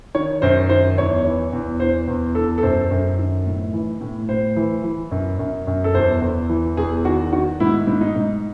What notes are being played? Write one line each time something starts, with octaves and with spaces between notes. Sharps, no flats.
D#3 C#5
F#2 C5
D#3 C5
E2 C#5
E3
E2
E2 C5
E2
E2 A4
A4
F#2 C5
F#2
D#3
A2
E3
A2
A2 C5
E3
E3
F#2
F#2
F#2
A4
E2 C5
E2
E3
E2 G#4
D#3 F#4
D#3 F#4
G#2 E4
G#2
D#4
G#2